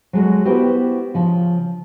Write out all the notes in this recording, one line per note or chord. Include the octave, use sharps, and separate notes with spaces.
F#3 G#3 F#4 G#4 A4
B3 E4 F#4 G4 B4 C5
C#3 F3